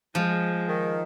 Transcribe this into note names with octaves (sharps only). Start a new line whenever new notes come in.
F3 G#3
D#3